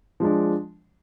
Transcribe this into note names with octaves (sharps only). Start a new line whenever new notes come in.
F3 G#3 D4